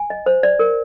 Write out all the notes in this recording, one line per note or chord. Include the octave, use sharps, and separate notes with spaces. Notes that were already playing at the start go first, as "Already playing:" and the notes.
Already playing: G#5
D#5
C5
D5
A#4